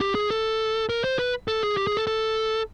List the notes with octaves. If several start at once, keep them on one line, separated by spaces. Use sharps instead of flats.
G4
G#4
A4
A#4
C5
B4
A4
G#4
G4
G#4
A4
A4